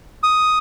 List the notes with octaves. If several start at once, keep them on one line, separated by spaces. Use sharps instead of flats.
D#6